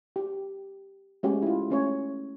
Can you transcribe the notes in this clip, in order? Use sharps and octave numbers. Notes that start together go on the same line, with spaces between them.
G4
G#3 A3 C#4 F#4 G4
E4 F4
A3 C#4 C#5